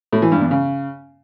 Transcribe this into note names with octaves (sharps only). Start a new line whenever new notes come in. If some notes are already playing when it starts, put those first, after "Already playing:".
A2
E3
G2
E2
C#3